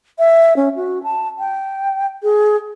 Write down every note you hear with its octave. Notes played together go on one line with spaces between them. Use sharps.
E5
C#4
F#4
A5
G5
G#4